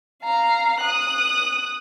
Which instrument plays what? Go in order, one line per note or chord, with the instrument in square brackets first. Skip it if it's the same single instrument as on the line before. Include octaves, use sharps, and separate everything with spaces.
[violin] F5 A#5
D#6 F#6